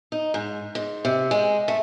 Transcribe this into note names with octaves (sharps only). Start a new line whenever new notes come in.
D#4
G#2
G#2
C3
G#3
A3